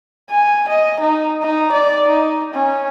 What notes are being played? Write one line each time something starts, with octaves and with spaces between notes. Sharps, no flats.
G#5
D#5
D#4
D#4
D5
D#4
C#4